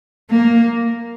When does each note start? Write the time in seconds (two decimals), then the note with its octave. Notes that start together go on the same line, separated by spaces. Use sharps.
0.30 A#3